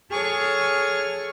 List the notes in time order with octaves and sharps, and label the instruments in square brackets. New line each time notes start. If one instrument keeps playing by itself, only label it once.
[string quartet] G#4 A4 C#5 C#6 F6